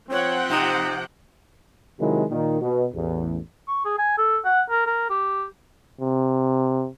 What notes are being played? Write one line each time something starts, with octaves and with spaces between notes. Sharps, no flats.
F3 C4 C#5 F#5 G5
C3 D#4
C3 D#3 F#3 G#3 E4
A#2 D#3
B2
A1 E2
C#6
G#4
G#5
A4
F#5
A#4
A#4
G4
C3